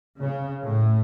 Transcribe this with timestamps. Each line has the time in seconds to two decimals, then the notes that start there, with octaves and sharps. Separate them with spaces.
0.20 C#3
0.65 A2